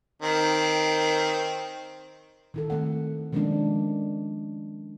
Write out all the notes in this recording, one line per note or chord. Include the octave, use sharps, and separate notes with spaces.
D#3 C4
D#3 E4 A4
D#3 A3 C4 F#5
D#3 F3 G#3 A#3 C#4 D4